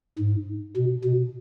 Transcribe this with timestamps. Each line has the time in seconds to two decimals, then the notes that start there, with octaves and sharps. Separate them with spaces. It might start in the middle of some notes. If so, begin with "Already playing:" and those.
0.19 G#2
0.76 B2
1.04 B2